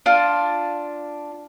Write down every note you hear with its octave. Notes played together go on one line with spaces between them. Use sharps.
D4 F4